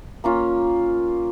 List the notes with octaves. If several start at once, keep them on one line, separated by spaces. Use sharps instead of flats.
A#3 C#4 F4